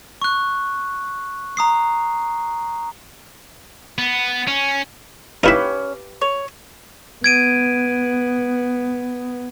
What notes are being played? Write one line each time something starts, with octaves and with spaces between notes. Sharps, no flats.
C#6 F#6
A#5 D#6 C7
B3
C#4
C#4 D#4 E4 G4 B4 E5 F5
C#5
B3 G#6 D7 D#7